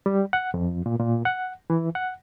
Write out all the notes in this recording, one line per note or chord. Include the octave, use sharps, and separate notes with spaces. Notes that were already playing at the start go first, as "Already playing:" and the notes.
G3
F#5
F2
A#2
A#2
F#5
E3
F#5